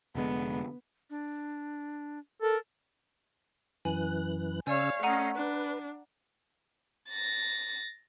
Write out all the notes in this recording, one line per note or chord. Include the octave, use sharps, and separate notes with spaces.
F1 D3 G#3 B3
D4
A4 A#4
F#2 E3 G#5 F#6
C#3 C#4 C#5 D5 F5 G#5 E6
A3 C#4 D#5 F5 F#5 A#5 D#7
D4 B4
A6 A#6